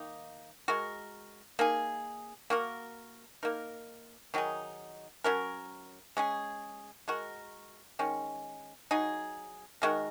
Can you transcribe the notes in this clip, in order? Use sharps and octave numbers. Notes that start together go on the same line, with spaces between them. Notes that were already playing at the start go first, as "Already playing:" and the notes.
Already playing: D#3 A#3 D#4
G#3 F#4 A#4
A#3 D#4 G#4
A#3 F#4 A#4
A#3 D#4 A#4
D#3 F#3 D#4 G#4
F#3 C#4 A#4
G#3 C#4 G#4
G#3 F#4 A#4
D#3 G#3 C#4
F#3 D#4 G#4
D#3 G#3 F#4 A#4